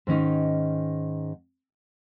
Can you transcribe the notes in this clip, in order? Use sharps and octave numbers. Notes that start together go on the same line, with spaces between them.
G#2 D#3 C#4 D#4